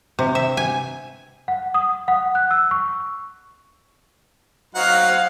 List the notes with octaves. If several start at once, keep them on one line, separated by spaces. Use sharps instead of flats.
C3
E5
G#5
F#5
D#6
F#5
F#6
E6
C#6
F#3 D#4 C5 F5 F#5